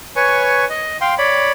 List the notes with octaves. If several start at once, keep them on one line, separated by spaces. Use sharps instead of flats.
B4 C#5 G#5 C#6
D#5
F5 G5 C6
C#5 D5 B5